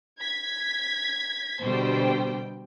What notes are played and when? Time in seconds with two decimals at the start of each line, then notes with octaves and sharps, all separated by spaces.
0.20 G#6 B6
1.63 B2 D3 G3 C5 G5